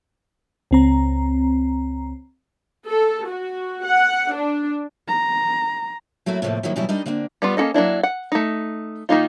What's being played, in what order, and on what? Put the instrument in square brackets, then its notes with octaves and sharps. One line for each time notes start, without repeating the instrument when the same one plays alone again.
[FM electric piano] C#2 C4 A#5
[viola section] A4
F#4
F#5
D4
[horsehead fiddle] A#5
[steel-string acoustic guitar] F#3 A3 A#3 E4 F#4
A2 C3 F3 F#3 A3 A#3
D#3 F3 F#3 A#3 E4
B2 E3 F#3 G3 B3 E4
G3 D4 D#4 A#4 D#5
D3 A#3 C4 D4
[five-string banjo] G3 B3 F4
A#3 C#4 F#4 A4 D#5
F#3 A#3 D4 E4
F#5
A3 D#4
D#3 A#3 D#4 F4